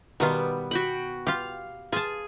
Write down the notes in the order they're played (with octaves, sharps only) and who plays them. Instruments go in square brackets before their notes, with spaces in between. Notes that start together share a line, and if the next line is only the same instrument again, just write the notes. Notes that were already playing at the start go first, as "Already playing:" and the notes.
[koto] B2 D#3 F4 [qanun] G3 B3
[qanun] F#4 G5 B5
[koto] F4 G4 [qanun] F5
[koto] F4 A5 [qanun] G#4